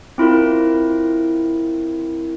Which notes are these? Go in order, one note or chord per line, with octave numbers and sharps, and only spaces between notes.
C4 E4 F4 A#4